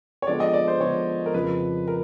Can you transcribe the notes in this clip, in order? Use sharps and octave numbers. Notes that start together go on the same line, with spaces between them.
C#5
D3 F3 G#3 B3 D5
D#5
D5
C5
D3 F3 G#3 B3 C#5
A#4
F2 C#3 F3 B4
A#4